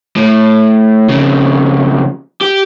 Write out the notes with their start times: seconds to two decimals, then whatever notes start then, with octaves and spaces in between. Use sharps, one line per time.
0.16 A2
1.10 F2 C#3
2.41 G4